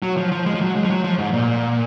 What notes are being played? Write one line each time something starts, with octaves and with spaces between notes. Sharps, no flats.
F#3
F3
F3
G#3
F3
F#3
G#3
F3
F#3
F3
G#2
A#2